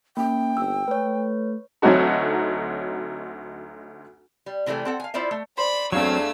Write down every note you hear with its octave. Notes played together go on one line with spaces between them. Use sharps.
A#3 C#4 G5
G1 E6
A3 B4 C#5
D2 F#3 C4 D#4 F#4 A4
G3
C3 E3 G3 A3 G#4
C4 A4 F#5
F5 G#5
E4 F4 C5 D5 E5
A3
C5 D5 B5
E2 F#3 A3 C4 D4 F5 E6 G#6